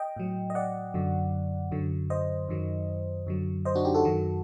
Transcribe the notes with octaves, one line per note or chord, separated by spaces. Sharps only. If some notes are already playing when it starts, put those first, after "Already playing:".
Already playing: D#5 G5
A2 F#3
D#5
D5 F#5
F#2 D3 F#3
F#2 D3 F#3
C5 D#5
F#2 D#3 F#3
F#2 D3 F#3
C5 D#5
D4 F#4
D#4 G4
F#4 A4
F#2 D#3 F#3